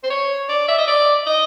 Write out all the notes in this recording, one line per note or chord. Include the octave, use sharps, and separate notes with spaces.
C5
C#5
D5
E5
D#5
D5
D#5